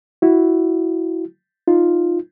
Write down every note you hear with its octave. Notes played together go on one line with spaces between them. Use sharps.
E4 F#4
D#4 F4